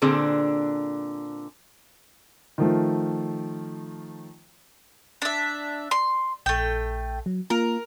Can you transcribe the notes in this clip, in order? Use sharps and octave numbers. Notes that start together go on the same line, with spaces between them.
A#2 D3 C4 D4 G#4
D#3 F3 A3
D4 E5
C6
A#1 A3 G5
F#3
A#3 F4 A#4